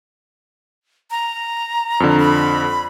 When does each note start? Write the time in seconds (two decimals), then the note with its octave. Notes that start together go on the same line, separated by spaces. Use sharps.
1.11 A#5
2.00 F2 D3
2.19 B5